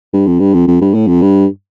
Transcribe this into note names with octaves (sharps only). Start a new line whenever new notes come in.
G2
F2
G2
F2
F2
G2
A2
F2
G2